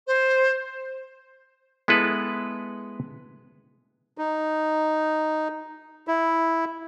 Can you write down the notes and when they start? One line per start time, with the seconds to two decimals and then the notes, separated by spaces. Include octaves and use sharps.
0.06 C5
1.88 G#3 B3 E4 A4 B4
4.18 D#4
6.08 E4